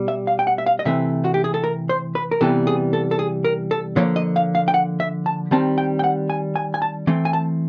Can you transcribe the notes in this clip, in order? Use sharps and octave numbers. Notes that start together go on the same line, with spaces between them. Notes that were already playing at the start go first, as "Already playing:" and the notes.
Already playing: B2 G3
E5
F5
G5
F#5
E5
F5
D#5
C3 E3 A3 C4 E5
F#4
G4
G#4
A4
A#4
C5
B4
A#4
C3 E3 G3 B3 A4
G#4
A4
A4
G#4
A#4
A4
D3 F3 A#3 C#5
D#5
F5
F5
G5
F#5
E5
A5
D#3 G3 C4 A5
G5
G5
F#5
G#5
G#5
G#5
A5
E3 A3 C4
G#5
A5